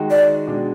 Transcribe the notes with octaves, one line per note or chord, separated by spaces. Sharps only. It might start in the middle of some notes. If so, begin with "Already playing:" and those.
Already playing: D#3 G#3 D#4 F#4
D5
B2 G#3 D4